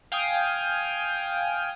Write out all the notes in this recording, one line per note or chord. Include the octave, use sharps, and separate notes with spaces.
F5 G5 G#5 D#6